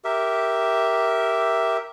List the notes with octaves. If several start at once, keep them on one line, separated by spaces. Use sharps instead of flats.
G4 A#4 E5